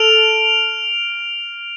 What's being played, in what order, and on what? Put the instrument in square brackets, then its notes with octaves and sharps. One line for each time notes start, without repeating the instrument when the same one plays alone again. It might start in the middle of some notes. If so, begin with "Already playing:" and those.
Already playing: [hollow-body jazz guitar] A4 [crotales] F6 D7 F7